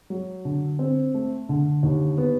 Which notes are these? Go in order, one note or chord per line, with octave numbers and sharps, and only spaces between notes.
F#3
D3
C4
A3
D3
D#2
B3